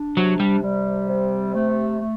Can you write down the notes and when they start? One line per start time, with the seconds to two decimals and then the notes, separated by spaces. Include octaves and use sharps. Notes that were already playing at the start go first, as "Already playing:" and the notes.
Already playing: D4
0.17 C3 F#3
0.40 G3
0.63 G3
1.09 C3
1.55 A3
2.01 A3